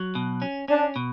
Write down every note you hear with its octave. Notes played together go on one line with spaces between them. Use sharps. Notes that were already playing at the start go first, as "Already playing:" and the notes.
Already playing: F#3
B2
C#4
C#4 D4
B2